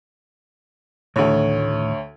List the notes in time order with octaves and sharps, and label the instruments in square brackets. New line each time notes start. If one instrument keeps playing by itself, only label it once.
[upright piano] D2 C#5 [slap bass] A2 D#3 E3